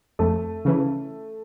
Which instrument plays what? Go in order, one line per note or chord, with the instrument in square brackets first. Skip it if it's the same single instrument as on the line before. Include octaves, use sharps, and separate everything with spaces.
[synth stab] F2 [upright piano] A3
[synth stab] C#3 E3